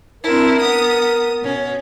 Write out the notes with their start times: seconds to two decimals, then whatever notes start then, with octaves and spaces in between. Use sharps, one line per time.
0.23 C4 D4 E4 A#4
0.60 B3 D#6
1.41 B2 C#4